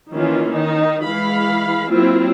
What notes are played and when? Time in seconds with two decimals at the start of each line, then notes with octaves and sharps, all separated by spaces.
0.12 D#3 E3 A#3 C#4 F4
0.51 D#3 D#4
1.04 E3 G#3 F5 B5
1.89 F#3 A#3 C4 E4 F4